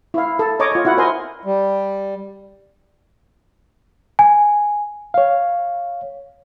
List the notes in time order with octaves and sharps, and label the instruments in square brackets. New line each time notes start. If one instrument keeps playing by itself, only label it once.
[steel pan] E4 F5
A4
C#5 D#5 A#5 D6
F4 C#5
E4 F#4 F#5
A#4 C5 D#5 G#5 C6
[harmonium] G3
[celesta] G#5
[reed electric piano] C#5 F5